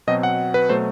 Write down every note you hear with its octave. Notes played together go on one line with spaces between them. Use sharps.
B2 F#3 C4 D#5
F#5
B4
B2 F#3 A3 C5